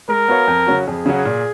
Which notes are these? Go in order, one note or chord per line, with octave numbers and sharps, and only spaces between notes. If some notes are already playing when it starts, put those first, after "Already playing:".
G#3 A#4
B3 F#4 C#5 F5
F2
C#3 F#3 C#4 F#4
F2 G#4
C#3 F#3 C#4 F#4
A#2